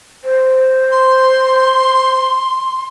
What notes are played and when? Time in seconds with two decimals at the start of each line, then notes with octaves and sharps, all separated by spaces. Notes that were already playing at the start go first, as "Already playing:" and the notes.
0.24 C5
0.91 C6